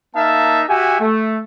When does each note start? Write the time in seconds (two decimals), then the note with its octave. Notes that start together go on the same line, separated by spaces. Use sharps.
0.16 A#3 D#4 E5 F5 A5
0.69 F#4 G4 E5 G#5
1.00 A3